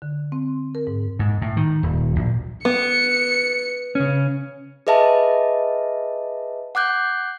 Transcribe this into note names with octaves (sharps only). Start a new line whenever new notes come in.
D3
C4
A#4
G#2
G#2
A2
D#3
D#1
A#1
B3 C#7
C#3 C#4
G#4 B4 D#5 E5 A5
F#5 D6 F#6 G6